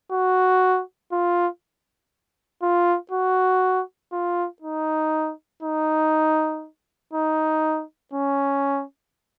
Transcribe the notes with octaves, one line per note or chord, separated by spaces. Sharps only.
F#4
F4
F4
F#4
F4
D#4
D#4
D#4
C#4